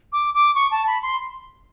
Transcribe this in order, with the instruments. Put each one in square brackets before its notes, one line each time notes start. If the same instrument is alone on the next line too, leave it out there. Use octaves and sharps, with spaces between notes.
[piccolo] D6
D6
C#6
A5
B5
C6